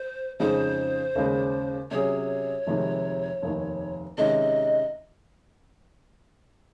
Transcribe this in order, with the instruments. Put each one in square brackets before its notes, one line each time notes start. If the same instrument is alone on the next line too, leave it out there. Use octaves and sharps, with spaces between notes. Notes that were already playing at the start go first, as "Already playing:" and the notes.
Already playing: [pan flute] C5
[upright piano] F2 C#3 G#3 D#4 G#4 [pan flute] C5
[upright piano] D#2 C#3 G#3
[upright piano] C3 F#3 C#4 G#4 [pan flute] C#5
[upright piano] F1 F2 C3 D#3 G#3
F1 D#2 D#3
[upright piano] C3 D#3 G#3 C#4 [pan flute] D#5